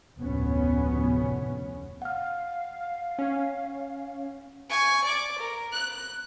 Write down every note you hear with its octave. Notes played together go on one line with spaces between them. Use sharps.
F1 D2 A2 B3 C#4
F5 F#5 F6
C#4
G#5 C#6
D5 D6
A#4
F#6